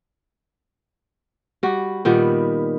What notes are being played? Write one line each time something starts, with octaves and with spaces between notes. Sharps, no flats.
G3 F#4
A#2 D#3 G3 B3